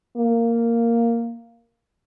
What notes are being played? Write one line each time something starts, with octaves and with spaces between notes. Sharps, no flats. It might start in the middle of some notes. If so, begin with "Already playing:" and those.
A#3